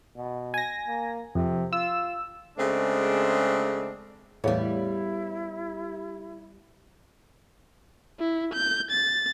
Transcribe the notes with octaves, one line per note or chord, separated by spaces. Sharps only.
B2
G#5 A#6
A#3
F2 C3
F4 E6
C#3 G#3 A3 C4 D4
E2 A2 G3 B3 E4 G#4 C#5 F5
E4
G6
A6